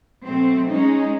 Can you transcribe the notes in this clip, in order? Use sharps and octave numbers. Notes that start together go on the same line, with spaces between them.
B2 F#3 A3 C4
G#3 C#4 D#4